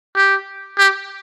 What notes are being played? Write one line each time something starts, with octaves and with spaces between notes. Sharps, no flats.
G4
G4